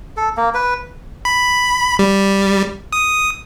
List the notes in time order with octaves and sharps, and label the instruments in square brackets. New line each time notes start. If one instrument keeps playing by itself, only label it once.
[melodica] A4
A#3
B4
[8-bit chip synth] B5
G3
D#6